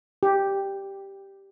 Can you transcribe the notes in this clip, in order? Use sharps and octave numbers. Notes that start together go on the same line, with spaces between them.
G4